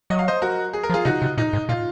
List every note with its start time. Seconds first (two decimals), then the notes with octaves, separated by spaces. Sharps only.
0.10 F#3 D#5
0.19 F5
0.28 C5 D#5
0.42 F#4 A#4
0.73 G#4
0.83 A#4
0.90 F3
0.94 F4 G#4
1.05 C3 D#4 F#4
1.22 C3
1.37 A#2 D#4
1.53 G#2
1.69 A#2 F4